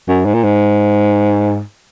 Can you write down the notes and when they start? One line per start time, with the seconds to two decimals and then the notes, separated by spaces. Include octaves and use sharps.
0.08 F#2
0.26 G#2
0.34 A#2
0.44 G#2